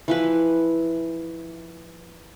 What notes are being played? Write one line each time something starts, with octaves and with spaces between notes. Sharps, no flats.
E3 F3 B4